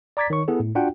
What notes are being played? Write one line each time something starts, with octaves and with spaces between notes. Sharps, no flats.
D5 A#5 D6 G#6 A6 B6
D#3 C#5 C#6
B3 E4 G#4 A4
A2
D4 F4 F#4 F#5 G5